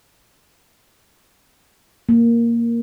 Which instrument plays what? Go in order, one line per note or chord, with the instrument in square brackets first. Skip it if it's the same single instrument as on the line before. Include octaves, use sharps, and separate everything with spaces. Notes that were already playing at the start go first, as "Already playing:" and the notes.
[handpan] A#3